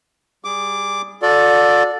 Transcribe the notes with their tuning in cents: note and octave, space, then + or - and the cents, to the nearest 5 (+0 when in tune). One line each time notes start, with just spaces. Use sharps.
G3 +0 G#4 -20 D6 +0
F#4 -45 A4 +0 D5 +0